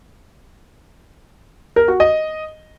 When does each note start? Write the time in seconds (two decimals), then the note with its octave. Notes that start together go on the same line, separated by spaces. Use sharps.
1.76 A#4
1.88 F#4
2.00 D#5